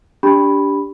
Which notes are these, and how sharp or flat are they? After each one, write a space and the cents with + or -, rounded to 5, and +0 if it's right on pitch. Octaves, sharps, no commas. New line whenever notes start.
D4 -25 G4 +0 B5 +0